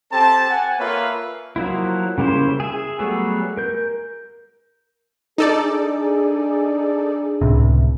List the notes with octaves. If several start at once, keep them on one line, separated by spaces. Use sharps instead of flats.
C4 G4 A4 A5
F#5 G#5
A#3 F4 A4 B4 C#5 E5
F3 F#3 A#3 E4
C#3 G3 A#3 E4 C5
G#4 E5
F#3 G3 A3 B3 G#4
A#4 G6
D4 D#4 G#4 A4 D5
C#2 A2 C3